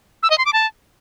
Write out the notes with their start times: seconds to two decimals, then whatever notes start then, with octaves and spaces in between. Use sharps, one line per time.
0.23 E6
0.30 D#5
0.38 C6
0.46 D6
0.53 A5